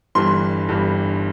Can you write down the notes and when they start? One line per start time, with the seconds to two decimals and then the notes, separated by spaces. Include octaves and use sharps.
0.15 G1 G2 E3 G3 C6
0.69 G1 G2 E3 G3